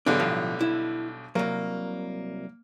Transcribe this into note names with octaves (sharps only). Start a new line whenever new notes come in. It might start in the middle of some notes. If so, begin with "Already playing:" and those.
B1 G#2 B2 D3 G3 D4
A2 F3 F5
E4
C2 F#3 A#3